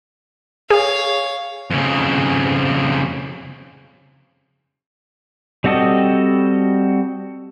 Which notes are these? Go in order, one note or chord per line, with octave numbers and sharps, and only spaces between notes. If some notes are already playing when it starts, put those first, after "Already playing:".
G#4 C#5 F5
F2 C#3
G3 C4 F#4 A4 D#5